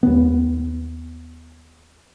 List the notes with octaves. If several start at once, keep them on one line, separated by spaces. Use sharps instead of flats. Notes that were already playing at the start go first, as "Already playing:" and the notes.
D#2 B3